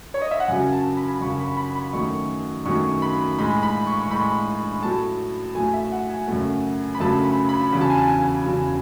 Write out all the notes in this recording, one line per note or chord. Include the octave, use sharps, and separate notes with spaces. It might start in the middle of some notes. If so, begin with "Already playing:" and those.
C#5
D#5
E5
F#5
F#2 C#3 F#3 G#5
A5
B5
F#2 C#3 F#3 C#6
B5
B5
B5
F#2 D#3 F#3 A3 C#6
F#2 D#3 F#3 A3 C#6
B5
A2 G#3 B5
B5
C#6
C#6
A2 G#3 B5
A2 F#3 A3 A5
A2 F#3 A3 G#5
E5
F#5
G#5
F#2 C#3 F#3 A3
B5
F#2 C#3 F#3 A3 A5
B5
B5
E2 C#3 F#3 B5
A5
G#5
A5
G#5
E2 C#3 F#3